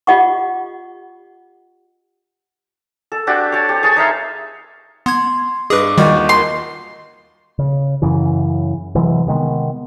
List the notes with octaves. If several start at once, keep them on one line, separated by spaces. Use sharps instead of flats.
F4 G4 D#5 F#5 C#6
A4
D4 F#4 G4
C#5 A5
G4 C5
G#4 C#5 A5
D#4 E5 F5 C6
B3 C6 G#6
G2 G#4 B4 D#5 D6
D#2 D#3 G3 F4 F#4 D#5 C#6 G6
A#4 C6
C#3
F#2 C#3 E3
C3 E3 F#3 G#3
C3 D#3 G#3 B3